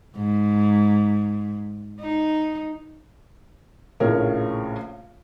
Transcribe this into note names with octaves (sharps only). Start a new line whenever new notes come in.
G#2
D#4
A#1 A2 C#3 A#4 C#5